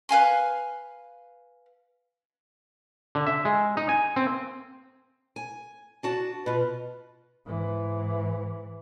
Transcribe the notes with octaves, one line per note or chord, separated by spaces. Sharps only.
B4 F5 G#5 C6
D3
E5
G#3
D#4
G#5
C4
G#5
D4 F#4 A5
B2 F4 B4
G#2 E3